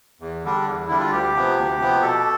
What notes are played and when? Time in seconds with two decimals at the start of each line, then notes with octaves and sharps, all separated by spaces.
0.20 E2
0.44 D3 G3 D4
0.66 E2
0.88 D3 G3 D4 E4
1.00 F4
1.11 D2 G4
1.34 C3 F3 B3
1.57 D2
1.79 C3 F3 B3
2.01 B2 A4